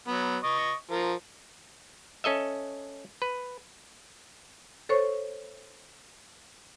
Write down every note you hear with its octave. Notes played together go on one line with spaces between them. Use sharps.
F#3 B3
D#5 C#6
F3 A#4
C#4 A4 D#5 E5
B4
A4 C5 C#5 C#6